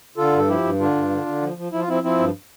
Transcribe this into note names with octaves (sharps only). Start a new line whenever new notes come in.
D3 F4 A4
G2 A4
F3 E4 G4
G2
D3 D4 F4
G2
D3
D3
F3
F3
F3 E4
F4
F3 C4 E4
F3 C4 E4
G2